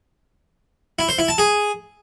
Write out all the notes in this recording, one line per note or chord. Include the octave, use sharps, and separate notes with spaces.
E4
C5
E4
A5
G#4